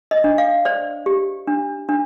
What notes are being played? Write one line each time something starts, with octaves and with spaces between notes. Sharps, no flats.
D#5
D4
F5
C5 D5
G4
D4
D4